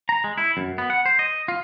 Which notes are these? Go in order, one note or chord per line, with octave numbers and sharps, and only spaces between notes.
A#5
G#3
E4
F#2
B3
F#5
C5
D#5
F4